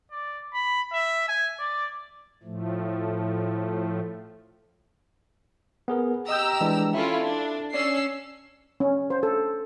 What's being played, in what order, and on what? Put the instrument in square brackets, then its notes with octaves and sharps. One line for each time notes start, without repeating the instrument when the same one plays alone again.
[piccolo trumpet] D5
B5
E5
G#5
D5
[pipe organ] A2 F3 A3
[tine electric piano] B3 G#4 A#4
[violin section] G4 A#5 E6 [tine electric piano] D#5 D#6 G6
[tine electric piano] E3 G#3 D4
[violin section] C#4 E4 F4 [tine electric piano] A4 E5
[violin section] D4
[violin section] C#4 E6 C7 [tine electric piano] D5
[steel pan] C#4
C5
A4